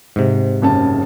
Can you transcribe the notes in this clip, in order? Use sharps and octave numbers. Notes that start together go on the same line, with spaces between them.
G#2 C3
F#1 C#3 A5